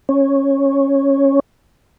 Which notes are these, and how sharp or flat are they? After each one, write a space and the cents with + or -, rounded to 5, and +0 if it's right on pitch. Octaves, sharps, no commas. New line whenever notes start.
C#4 -10